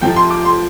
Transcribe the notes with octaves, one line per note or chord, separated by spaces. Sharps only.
F2 C3 F3 G5
C6
D6
C6